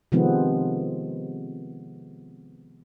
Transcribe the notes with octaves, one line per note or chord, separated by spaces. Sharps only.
C3 D#3 F3 G#3 B3 C4